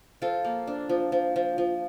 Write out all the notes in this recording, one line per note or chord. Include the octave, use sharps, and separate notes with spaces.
F3 F4 A4
A#3
D4
F3
F3
F3
F3